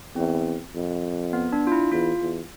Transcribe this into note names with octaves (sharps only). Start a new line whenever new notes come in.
E2 C4
F2
B3
D4
F4
E4
E2 F4
E2